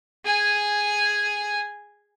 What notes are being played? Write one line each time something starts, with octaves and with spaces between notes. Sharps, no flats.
G#4 G#5